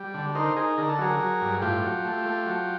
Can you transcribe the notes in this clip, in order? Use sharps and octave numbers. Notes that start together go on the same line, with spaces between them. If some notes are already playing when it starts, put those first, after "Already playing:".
Already playing: G3
D3
D#4 A#4 C5
D#4 G#4 A#4
D3 A#4
A4
F#3 G#4 A#4
F#3
G2
A2 F4 G4
F#3
A3
A3
F#3